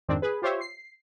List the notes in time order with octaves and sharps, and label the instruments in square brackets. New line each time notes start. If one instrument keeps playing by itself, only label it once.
[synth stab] F2 G#2 D#3 C4 D4
G#4 B4
F4 G4 C5 C#5 E5
C7